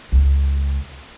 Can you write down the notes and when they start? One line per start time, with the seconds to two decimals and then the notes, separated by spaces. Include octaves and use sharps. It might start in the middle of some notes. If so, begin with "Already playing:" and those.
0.12 C#2